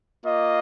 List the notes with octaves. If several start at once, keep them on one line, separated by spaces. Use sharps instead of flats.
A#3 F4 D#5